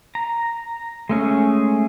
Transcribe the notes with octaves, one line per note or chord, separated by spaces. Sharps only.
A#5
G#3 A3 C#4 G#4